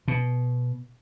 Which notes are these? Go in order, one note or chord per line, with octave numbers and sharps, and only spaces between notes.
B2